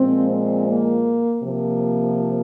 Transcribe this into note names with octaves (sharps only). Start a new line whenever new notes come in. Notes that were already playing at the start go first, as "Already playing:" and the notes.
Already playing: A#2 F3 G#3 C4
C4
A#3
C3 F3 A#3